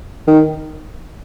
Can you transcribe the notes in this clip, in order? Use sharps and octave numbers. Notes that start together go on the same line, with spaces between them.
D#3